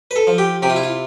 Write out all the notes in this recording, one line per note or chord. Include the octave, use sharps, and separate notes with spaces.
B4
A4
F3
G4
C3 G4
F4
E4
F4